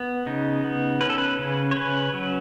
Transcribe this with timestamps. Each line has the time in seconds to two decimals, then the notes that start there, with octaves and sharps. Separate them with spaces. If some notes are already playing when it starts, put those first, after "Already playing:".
Already playing: B3
0.26 C#3 D#4
0.64 B3
1.01 C#4 B4
1.10 A4
1.18 B4
1.39 C#3
1.71 C#5
1.76 C#4 B4
2.14 F#3